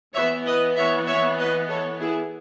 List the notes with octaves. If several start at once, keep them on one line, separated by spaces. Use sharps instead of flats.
E3 C#5 E5
B3
B4 D#5
C#5 E5
C#5 E5
B4 D#5
A4 C#5
E4 G#4